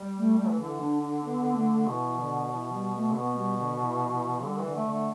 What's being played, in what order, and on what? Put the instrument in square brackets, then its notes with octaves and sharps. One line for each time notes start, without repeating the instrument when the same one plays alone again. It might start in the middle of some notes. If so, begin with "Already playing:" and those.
Already playing: [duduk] G3
[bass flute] A3
A3
[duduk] E3
[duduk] D3 [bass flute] E3
[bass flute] D4
D4
B3
A3
[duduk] B2 [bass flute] E3
[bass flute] D3
E3
G3
A3
[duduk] D3
[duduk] B2 [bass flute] B3
[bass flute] G3
D3
E3
E3
[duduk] D3 [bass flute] G3
[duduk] E3
[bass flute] D3
[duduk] A3
[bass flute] D3
[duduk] A3